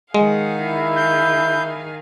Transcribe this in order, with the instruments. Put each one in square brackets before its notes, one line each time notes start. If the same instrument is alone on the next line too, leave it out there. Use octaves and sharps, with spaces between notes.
[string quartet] D#3 G#4 F5 [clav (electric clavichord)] G#3 [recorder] F#5
[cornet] E4
[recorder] G6